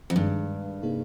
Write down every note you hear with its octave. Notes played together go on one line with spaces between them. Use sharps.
F2
G2 D#3 G#3 D4 G#4
C3 G3 A#3 D#4 G#4